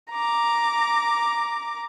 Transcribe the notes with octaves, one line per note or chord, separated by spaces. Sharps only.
A#5 D6